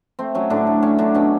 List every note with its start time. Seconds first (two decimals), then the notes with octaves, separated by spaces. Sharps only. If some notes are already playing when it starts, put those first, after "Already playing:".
0.19 A3 C4
0.35 F#3 C#4
0.50 A2 D3 D4
0.67 A2
0.83 A3 C#4
0.98 D3 F#3 D4
1.14 B2 C#4